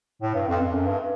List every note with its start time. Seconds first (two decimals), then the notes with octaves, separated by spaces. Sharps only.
0.22 A2
0.35 G2
0.49 F2
0.61 F2
0.74 F#2
0.87 G2